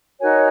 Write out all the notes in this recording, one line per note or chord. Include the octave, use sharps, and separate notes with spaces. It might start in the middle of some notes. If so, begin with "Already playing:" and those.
D#4 F#4 A#4 C#5 G#5